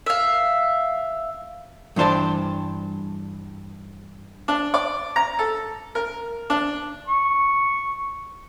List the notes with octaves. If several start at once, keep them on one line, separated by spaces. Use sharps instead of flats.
E5 F5
G2 E3 D4 C5 D5 A5
D4
D5
A#5
A4
A#4
D4
C#6